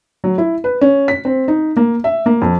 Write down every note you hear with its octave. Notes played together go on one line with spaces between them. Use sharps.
F#3
E4
B4
C#4
B6
C4
D#4
A#3
E5
A#3
F2